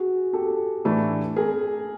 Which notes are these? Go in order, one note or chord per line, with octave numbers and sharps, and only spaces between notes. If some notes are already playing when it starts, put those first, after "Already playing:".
Already playing: F#4 G#4
G4 A4
A2 E3 A3 D4
G#4 A#4